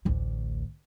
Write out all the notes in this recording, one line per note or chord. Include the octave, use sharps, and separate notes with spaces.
A1 D2